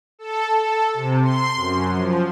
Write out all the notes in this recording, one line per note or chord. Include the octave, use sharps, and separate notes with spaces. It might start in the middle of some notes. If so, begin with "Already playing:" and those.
A4
A4
C3
C6
F#2
F3